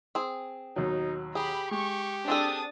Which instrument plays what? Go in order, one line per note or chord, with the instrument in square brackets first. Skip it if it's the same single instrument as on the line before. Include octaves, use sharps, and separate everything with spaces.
[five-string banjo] C4 G#4
[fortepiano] D#2 B2 F#3 [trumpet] D#4
[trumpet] G4 [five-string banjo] G#4 [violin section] B5
[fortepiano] G#3 [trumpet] G4 [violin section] C#6
[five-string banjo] C4 G#4 A4 [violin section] D4 D#6 A6